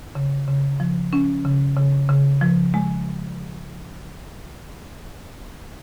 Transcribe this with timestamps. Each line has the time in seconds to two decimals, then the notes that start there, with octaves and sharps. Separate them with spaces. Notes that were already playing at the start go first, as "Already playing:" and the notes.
0.15 C#3
0.47 C#3
0.80 F3
1.13 C#4
1.45 C#3
1.77 C#3
2.09 C#3
2.41 F3
2.74 G#3